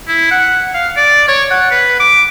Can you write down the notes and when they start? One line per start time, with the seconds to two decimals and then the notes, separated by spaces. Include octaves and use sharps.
0.08 E4
0.31 F#5
0.74 F5
0.97 D5
1.28 C#5
1.51 F#5
1.71 B4
2.00 D6